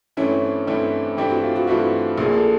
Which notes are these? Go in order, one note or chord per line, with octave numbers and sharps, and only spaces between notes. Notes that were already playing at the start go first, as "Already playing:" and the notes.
G2 E3 A3 C4 C#4 E4
G2 E3 A3 C4 E4
G2 E3 A3 C4 E4 G4
F#4
F4
F#4
G2 E3 A3 C4 E4 F#4
A#1 A#2 F3 A#3 G#4
A4